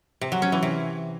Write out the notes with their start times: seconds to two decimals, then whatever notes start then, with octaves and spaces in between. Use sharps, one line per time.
0.21 C3
0.32 F#3
0.42 C#4
0.52 E3
0.63 C3